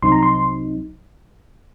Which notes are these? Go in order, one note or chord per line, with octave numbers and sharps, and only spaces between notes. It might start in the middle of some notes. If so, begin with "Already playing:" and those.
C2 C3 F#3 C4 D#4 C6
A#5
C6